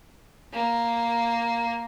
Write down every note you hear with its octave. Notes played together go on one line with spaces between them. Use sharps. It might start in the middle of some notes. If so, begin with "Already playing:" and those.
A#3